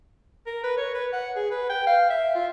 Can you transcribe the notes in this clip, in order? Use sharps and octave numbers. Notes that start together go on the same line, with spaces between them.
A#4
B4
C#5
B4
F#5
G#4
B4
G5
F5
E5
F4